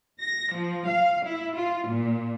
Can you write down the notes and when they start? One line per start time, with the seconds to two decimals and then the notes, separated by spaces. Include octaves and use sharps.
0.20 A#6
0.52 F3
0.87 F5
1.23 E4
1.56 F4
1.86 A#2